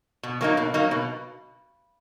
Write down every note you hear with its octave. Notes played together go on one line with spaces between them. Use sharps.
B2
F#3 A#3 D#4
B2
F#3 A#3 D#4
B2